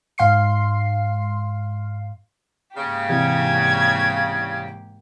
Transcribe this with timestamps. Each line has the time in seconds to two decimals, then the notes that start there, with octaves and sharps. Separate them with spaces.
0.18 G#2 F5 C6 C7
2.77 G#2 C#3 A#3 G4
3.09 C2 E3 G#6